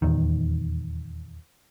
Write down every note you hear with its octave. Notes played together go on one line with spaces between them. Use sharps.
D#1 B1 E2 D#3